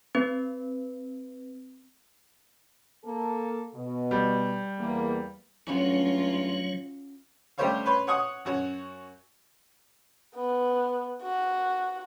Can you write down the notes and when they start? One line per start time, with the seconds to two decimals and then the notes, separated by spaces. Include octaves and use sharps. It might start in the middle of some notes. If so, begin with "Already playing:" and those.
0.15 C4 B4
3.04 A#3 A4
3.74 B2
4.11 G3
4.79 E2 A#3
5.67 G#1 G2 F#3 A3 C#4 F4 F#4 C#5
7.58 G3 A3 G4 C5 C#5 F5
7.86 B4 C#5 C6
8.07 C#5 F#5 C#6 D#6
8.45 F#2 F#4 C#5
10.34 B3
11.22 F#4